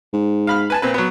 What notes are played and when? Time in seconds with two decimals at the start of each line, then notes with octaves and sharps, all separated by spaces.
0.13 G#2
0.47 F5 B5 F6
0.70 B4 G#5 A5
0.82 A#2 C4 B4
0.94 F#3 B3